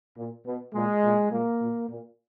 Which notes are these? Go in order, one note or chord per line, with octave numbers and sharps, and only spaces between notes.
A#2
B2
A#2 G#3
A#2
A#2 A#3
A#2
A#2